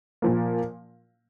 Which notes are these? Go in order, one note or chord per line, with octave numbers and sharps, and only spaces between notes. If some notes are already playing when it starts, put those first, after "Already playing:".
A#2 F3 A#3